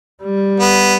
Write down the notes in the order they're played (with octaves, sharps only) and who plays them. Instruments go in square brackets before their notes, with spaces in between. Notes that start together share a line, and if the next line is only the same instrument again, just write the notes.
[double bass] G3
[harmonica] B3